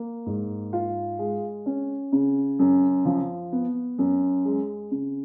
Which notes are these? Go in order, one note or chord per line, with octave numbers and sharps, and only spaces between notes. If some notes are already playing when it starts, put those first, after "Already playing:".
Already playing: A#3
G#2
F4
G#3
C#4
C#3
F#2
F3
B3
F#2
G#3
C#3